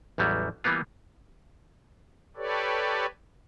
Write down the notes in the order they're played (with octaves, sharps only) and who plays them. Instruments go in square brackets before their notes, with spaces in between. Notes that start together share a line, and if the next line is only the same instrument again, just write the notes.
[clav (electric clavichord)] A1 E2 F#3 G3
E3 G3 A#3 B3 F4
[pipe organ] G4 A4 B4 C#5 D5